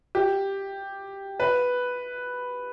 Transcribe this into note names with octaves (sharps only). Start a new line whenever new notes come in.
G4
B4